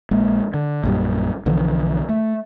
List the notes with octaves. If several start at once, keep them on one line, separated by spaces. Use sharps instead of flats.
A#1 G#3 A#3
D3
A#1 F#2 G3
B1 D3 E3 F3
A3